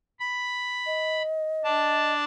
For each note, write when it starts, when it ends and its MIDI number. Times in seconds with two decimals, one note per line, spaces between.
0.20 1.22 83
0.86 2.13 75
1.64 2.25 62
1.64 2.25 81